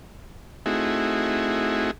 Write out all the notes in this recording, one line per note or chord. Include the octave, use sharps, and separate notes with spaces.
A3 C4 D#4 E4 F#4 G#4